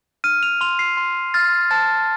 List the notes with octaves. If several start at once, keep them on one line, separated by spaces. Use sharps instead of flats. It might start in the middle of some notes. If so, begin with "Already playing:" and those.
F6 D#7
F7
C6 F7
C7
C6
F6 A6
A5 A6